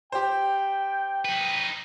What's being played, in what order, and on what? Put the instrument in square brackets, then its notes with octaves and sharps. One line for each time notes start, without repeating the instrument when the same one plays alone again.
[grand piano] G4 C5 [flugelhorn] G5
[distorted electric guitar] D#4 B4